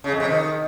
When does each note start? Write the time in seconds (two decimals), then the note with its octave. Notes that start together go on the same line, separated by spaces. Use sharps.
0.04 C#3
0.12 F2
0.20 C3
0.28 D#3